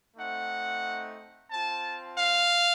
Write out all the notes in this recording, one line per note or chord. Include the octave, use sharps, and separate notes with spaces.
A3 C4 D#4 F#5
C4 F4 A5
F5